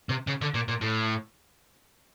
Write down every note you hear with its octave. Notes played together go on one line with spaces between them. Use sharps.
C3
C#3
D3
A#2
A#2
A2